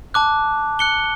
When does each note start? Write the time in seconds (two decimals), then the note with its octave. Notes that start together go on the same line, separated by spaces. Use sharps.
0.14 A5 D6 F#6
0.79 F#6 C#7 G7